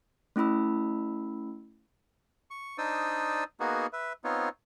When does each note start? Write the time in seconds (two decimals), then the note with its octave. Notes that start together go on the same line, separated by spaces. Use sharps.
0.36 A3 C#4 E4 B5 E6
2.51 C#6
2.78 D4 D#4 C5 D5 D#6 E6
3.60 A#3 B3 D#4 F#4 G#4
3.93 B4 E5
4.24 B3 C4 D#4 F4 C#5